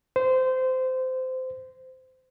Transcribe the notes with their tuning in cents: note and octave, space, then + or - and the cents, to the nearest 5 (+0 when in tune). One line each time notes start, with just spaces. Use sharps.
C5 -20